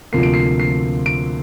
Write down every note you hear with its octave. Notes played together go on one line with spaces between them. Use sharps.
D2 C3 F3 A#3 C7
D7
C7
C7
D7